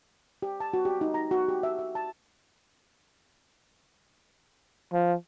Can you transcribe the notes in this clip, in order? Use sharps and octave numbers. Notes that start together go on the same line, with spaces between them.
G4
A5
F#4
G4
D#4
A#5
F#4
G4
E5
E5
A5
F3